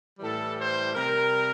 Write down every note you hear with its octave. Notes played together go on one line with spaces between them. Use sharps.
A2 E3 G3 A4
C5
C3 G3 A#4